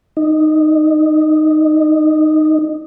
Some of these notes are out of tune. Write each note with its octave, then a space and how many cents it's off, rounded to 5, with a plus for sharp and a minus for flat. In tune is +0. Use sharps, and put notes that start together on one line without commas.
D#4 -10